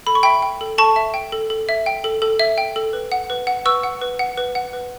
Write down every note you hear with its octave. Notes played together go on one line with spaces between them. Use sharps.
A4 B5
C#6
E5 G5 B5
G5
A4
A4 A5 C#6
E5
G5
A4
A4
E5
G5
A4
A4
E5
G5
A4
B4
F#5
B4
F#5
B4 C#6 E6
F#5
B4
F#5
B4
F#5
B4